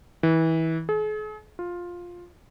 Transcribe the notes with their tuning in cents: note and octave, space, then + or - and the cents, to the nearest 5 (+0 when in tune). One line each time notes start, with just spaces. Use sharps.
E3 -25
G#4 +45
F4 +10